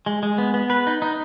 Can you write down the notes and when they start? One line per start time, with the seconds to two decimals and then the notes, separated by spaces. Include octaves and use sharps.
0.06 G#3
0.23 G#3
0.38 B3
0.54 B3
0.70 B4
0.87 D#4
1.02 D#4